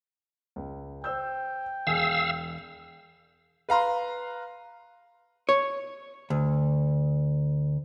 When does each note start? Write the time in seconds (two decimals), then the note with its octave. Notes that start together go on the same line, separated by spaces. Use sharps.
0.56 C#2
1.04 C5 G5 E6 G6
1.87 E1 G#4 F5 G#5 E6
3.69 B4 F5 A#5 C6
5.49 C#5
6.30 D2